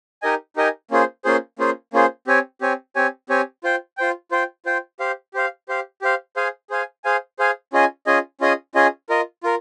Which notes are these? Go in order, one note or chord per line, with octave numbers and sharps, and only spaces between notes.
D#4 G4 A#4 D#5 G#5
D#4 G4 A#4 D#5 G#5
A#3 C#4 F4 G#4 C5
A#3 C#4 F4 G#4 C5
A#3 C#4 F4 G#4 C5
A#3 C#4 F4 G#4 C5
C4 G4 C#5 G#5
C4 G4 C#5 G#5
C4 G4 C#5 G#5
C4 G4 C#5 G#5
F4 C5 G5
F4 C5 G5
F4 C5 G5
F4 C5 G5
G4 C5 F5
G4 C5 F5
G4 C5 F5
G4 C5 F5
G#4 C5 F5 G#5
G#4 C5 F5 G#5
G#4 C5 F5 G#5
G#4 C5 F5 G#5
C#4 F4 G#4 D#5 G#5
C#4 F4 G#4 D#5 G#5
C#4 F4 G#4 D#5 G#5
C#4 F4 G#4 D#5 G#5
F4 A#4 D#5
F4 A#4